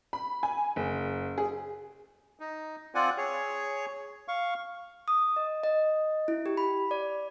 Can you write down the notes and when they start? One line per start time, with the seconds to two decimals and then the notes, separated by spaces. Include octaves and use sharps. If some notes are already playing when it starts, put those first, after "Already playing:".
0.13 B5
0.43 G#5
0.76 F#1
1.38 G#4
2.39 D#4
2.95 C4 F4 D5 F#5 G#5
3.17 G#4 C#5
4.28 F5 C#6
5.08 D#6
5.36 D#5
5.64 D#5
6.28 E4
6.46 G4
6.57 B5
6.91 D5